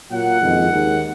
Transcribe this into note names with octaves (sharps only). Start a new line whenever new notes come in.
A#2 F#3 A#3 F4 F#5
F#1 F2 D#3 G#3 D#4
D#2 D#3 G#3 D#4